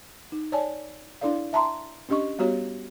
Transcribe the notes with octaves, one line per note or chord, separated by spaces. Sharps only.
D#4
C#5 D5 G#5 A5
D4 E4 A4 D5 F5
E5 A5 A#5 C6
C#4 D4 G4 D#5 C#6
G3 B3 F#4 G4 C#5